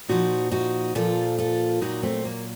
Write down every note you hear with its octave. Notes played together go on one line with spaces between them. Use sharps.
A#2 F3 D#4 F#4
D#4 F#4
A#2 F3 F4 A4
F4 A4
A#2 F#3 D#4 F#4
A3 C4
A#3